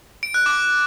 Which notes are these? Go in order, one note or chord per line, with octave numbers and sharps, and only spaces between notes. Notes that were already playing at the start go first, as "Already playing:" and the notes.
D7
F#6
D6